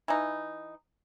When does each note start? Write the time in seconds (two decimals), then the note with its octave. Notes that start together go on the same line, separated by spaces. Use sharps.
0.08 E3 D#4